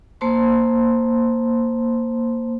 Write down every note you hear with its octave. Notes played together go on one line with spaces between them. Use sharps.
A#3 C5 A5 C6